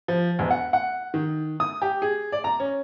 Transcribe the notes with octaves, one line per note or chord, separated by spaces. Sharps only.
F3
E1
F#5
F#5
D#3
D#6
G4
G#4
D5
A#5
C#4